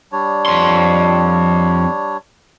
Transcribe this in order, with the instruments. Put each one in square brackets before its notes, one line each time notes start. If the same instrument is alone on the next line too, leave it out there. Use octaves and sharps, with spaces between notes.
[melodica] G3 D4 C#5
[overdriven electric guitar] F2 C6